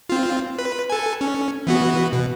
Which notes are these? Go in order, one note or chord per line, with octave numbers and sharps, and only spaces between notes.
C4 F4
B4
A4 G#5
C#4
E3 B3 F#4
B2